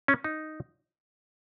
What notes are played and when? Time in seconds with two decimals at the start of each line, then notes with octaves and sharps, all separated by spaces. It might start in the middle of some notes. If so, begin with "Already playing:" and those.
0.08 C#4
0.24 D#4